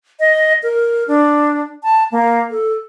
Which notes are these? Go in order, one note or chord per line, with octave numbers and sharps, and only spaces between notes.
D#5
A#4
D4
A5
A#3
A4